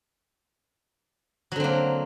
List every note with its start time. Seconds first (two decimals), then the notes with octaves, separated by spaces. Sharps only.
1.52 F#3
1.56 D3
1.60 C4
1.64 A#3